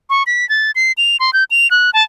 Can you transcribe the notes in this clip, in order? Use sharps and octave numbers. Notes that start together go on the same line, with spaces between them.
C#6
B6
A6
C7
F7
C6
G6
F7
F#6
A5